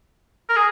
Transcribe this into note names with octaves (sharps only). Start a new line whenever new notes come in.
A#4
G#4